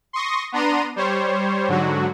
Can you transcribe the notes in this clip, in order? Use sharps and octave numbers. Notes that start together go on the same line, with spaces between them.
C6 C#6 D#6 A#6
B3 D4 A#5 C6 D#7
G3 C5 C#5
G#2 D3 F#3 F#4